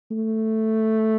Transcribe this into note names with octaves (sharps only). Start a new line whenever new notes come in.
A3